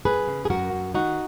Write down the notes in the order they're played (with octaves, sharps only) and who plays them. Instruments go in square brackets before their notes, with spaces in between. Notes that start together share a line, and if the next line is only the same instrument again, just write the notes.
[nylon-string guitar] F#2 G#4 B4
C#3
G#4
F#2 F#4 A#4
F#2
D#3 D#4 F#4